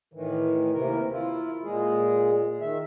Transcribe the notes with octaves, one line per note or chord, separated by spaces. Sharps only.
A2 D#3 E3
D#2 C3 E3 A#4
E4 F4
A#2 G#3 G#4
D#3 E5